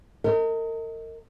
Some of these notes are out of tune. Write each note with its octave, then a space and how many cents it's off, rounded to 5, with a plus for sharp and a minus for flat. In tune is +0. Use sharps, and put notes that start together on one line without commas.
A#4 -40 D#5 +25